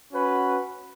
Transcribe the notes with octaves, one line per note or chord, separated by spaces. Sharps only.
C#4 F#4 B4